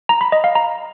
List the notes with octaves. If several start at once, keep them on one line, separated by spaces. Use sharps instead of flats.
A#5
B5
D#5
F5
A#5